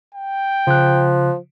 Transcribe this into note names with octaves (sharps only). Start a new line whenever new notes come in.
G5
C#3 F3 F#6